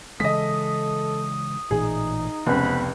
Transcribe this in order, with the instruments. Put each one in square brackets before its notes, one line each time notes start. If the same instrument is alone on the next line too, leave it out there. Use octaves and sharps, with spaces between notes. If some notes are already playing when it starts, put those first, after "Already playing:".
[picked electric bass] C#3 E3 G#3 [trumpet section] A4 [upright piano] D#5 B6 [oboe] D#6
[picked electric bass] A1 A#2 E3 [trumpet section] D#4 [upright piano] G#4
[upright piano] F1 C#2 [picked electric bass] B3 [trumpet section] C5 B5 [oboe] F#5